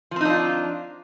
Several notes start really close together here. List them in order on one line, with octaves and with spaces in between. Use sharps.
F3 C4 D#4 D4 F4